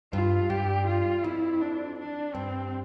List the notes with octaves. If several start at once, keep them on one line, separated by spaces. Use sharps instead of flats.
G2 F4
G2 G4
F4
F2 E4
D4
D4
G2 C4